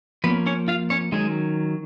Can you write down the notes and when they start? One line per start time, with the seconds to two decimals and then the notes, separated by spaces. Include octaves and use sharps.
0.24 F3 A#3 B3 C#4 B4
0.46 C#4 C#5
0.68 F4 F5
0.90 C#4 C#5
1.12 D#3 F#3 G#3 C#4 G#4